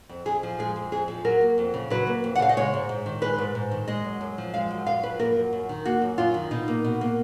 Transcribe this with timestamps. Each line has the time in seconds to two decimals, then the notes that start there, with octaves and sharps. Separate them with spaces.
0.09 F2
0.26 F2 G#4
0.43 F3
0.59 G#3 G#4
0.76 F2
0.92 F2 G#4
1.08 F3
1.25 F#3 A#4
1.41 A#3
1.58 F2
1.74 C#3
1.90 F#3 B4
2.07 A#3
2.24 F2
2.35 F#5
2.39 C#3 F5
2.49 D#5
2.57 G#3 C#5
2.74 G#2
2.89 G#2
3.06 D#3
3.22 G#3 B4
3.38 G#2
3.55 G#2
3.71 D#3
3.88 G#3 D#5
4.04 F#2
4.21 F#2
4.38 F3
4.54 G#3 F5
4.71 F#2
4.86 F#2 F5
5.03 F3 B4
5.19 A#3 A#4
5.36 F#2
5.53 F#2
5.69 D#3
5.85 A#3 F#4
6.02 F#2
6.18 F#2 F4
6.34 D#3
6.51 B2 D#4
6.68 A#3
6.84 B2
7.01 A#3